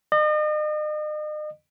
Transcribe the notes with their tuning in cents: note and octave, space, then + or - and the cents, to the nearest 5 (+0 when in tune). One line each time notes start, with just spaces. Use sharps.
D#5 -40